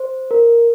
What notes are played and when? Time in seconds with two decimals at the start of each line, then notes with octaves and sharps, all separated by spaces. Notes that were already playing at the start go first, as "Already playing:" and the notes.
Already playing: C5
0.31 A#4